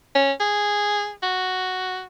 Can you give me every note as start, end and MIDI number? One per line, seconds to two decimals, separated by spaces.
0.15 0.32 61
0.40 1.12 68
1.22 2.05 66